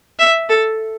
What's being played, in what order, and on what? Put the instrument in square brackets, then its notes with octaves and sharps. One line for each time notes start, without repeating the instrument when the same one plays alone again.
[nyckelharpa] E5
A4